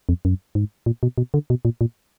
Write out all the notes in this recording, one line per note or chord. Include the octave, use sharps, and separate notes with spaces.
F2
F#2
G#2
A#2
B2
B2
D3
B2
A#2
A#2